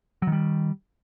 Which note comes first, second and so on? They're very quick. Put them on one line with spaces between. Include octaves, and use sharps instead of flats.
F#3 D#3 G3